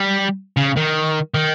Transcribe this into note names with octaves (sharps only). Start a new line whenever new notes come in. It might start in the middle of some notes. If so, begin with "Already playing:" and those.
Already playing: G3
C#3
D#3
D#3